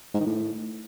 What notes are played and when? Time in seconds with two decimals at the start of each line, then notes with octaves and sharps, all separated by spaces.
0.14 G#2
0.20 D#3
0.26 A2